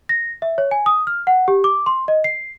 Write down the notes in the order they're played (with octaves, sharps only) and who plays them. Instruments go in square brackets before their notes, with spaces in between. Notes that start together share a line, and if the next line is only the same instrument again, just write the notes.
[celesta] A#6
E5
C#5
G#5
D#6
F6
F#5
G4
D6
C6
D#5
C7